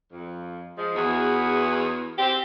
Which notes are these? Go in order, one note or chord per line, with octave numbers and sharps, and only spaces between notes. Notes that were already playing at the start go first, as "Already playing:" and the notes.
F2
F3 G#3
E2 E3 F#4 G#4
C4 G4